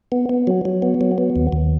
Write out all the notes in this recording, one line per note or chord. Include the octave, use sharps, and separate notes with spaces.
B3
B3
F#3
F#3
B3
F#3
B3
D#2
D#2